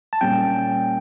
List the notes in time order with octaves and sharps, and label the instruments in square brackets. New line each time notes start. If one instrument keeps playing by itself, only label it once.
[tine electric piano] A5
[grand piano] A#2 G3 C#4 [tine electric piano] G5